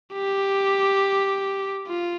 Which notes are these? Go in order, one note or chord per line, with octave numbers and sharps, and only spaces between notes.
G4
F4